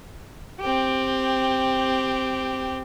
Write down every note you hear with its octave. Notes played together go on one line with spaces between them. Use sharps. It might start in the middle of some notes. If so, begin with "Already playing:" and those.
C4 G4